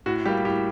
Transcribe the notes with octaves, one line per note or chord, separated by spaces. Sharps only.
A2 F#4
G3 A#3 G4
A2 G4